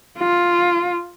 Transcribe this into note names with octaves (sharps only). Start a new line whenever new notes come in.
F4